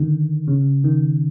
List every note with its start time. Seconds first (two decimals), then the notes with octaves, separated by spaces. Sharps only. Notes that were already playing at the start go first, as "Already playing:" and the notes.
Already playing: D3 D#3
0.48 C#3
0.84 D#3